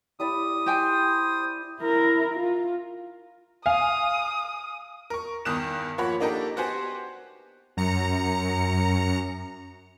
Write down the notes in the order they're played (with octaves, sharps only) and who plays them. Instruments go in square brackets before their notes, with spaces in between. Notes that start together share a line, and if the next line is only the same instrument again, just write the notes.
[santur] G3 E4 D5 [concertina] D#6
[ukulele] G4 G5 G#5 [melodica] C5
[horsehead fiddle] E4 A#4
F4
[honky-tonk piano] F5 G#5 [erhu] D#6
[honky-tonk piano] A#4 C#6
E2 G2 D#3 D#6 F#6 E7
F3 A#3 C#5 F#5 B5
A#3 D4 D#4 G4 A4 A#4
B3 F#4 G4 C5 F#5 G#5
[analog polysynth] F#2 A#5 C#7